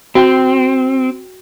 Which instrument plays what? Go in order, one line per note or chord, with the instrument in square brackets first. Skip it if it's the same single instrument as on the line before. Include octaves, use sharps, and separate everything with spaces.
[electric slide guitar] C4 [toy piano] F#4 G5